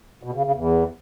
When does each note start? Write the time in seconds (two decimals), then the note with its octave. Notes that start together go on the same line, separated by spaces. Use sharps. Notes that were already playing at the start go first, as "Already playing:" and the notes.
0.23 B2
0.34 C#3
0.44 C#3
0.54 E2